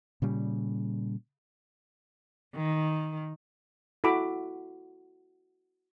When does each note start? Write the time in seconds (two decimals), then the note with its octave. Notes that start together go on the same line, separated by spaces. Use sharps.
0.22 A#2 C#3 G3
2.56 D#3
4.04 E4 F#4 A4 B5 D6